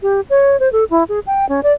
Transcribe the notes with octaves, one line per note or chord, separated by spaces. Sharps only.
G4
C#5
C5
A4
E4
G#4
G5
C#4
D5